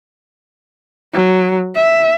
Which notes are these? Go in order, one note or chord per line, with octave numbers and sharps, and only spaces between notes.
F#3
E5